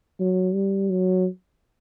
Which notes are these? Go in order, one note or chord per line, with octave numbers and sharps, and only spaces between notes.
F#3
G3
F#3